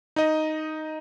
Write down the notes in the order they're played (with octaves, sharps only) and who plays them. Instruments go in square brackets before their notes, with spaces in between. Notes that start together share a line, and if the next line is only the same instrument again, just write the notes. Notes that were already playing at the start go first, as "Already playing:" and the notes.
[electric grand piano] D#4 D#5